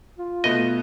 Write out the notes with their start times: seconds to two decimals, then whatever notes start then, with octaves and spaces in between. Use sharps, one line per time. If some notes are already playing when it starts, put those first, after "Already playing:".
0.18 F4
0.44 B2 A3 B3 D#5